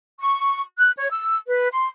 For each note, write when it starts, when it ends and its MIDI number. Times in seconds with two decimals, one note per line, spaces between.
0.18 0.60 85
0.77 0.90 90
0.97 1.08 73
1.10 1.35 88
1.47 1.68 71
1.71 1.88 84